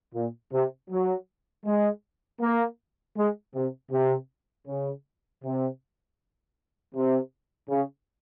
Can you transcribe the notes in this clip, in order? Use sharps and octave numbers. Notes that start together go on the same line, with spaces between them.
A#2
C3
F#3
G#3
A#3
G#3
C3
C3
C#3
C3
C3
C#3